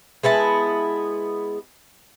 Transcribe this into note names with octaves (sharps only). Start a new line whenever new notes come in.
G#3 B3 E4 A5